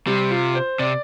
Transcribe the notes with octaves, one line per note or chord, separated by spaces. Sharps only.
C3 G3
F4
C5
C3 D5